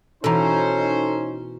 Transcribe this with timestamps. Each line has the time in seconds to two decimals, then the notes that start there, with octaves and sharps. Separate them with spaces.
0.24 B2 E3 C#4 D#4 A4 C5 A#5